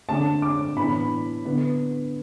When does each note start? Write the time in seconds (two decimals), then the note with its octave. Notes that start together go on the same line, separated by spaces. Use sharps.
0.09 D3 A3 D4 A5
0.42 D6
0.77 A2 E3 B3 D4 B5
1.45 D3 B3 D4